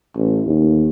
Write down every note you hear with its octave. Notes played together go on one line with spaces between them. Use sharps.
A1
D#2